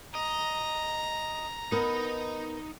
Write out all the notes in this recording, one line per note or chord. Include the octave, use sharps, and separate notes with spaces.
D#5 A#5
B3 D#4 A#4 D#5